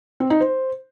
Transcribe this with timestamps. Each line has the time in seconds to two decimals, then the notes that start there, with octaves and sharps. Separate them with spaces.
0.20 C4
0.30 D#4
0.40 C5